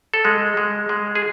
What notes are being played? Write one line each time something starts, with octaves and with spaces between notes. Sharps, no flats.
A4
G#3
G#3
G#3
G#4